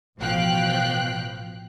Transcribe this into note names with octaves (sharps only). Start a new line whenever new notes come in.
A1 B2 F3 F5 G5 F#6